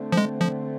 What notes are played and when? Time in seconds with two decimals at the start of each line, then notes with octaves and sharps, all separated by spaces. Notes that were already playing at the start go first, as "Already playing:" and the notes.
Already playing: D3 A3 C4
0.12 F3
0.17 G#3
0.41 F3